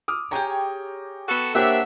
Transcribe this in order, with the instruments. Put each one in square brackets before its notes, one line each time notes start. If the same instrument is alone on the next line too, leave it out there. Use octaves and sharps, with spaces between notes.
[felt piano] D6 D#6 F6
[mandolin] G4 G#4 C#5 [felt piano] G5 A#5 C#6
[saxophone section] B3 F#4 A4
[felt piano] A#3 G4 C5 [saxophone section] D4 E5 [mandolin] C#5 F#5 E6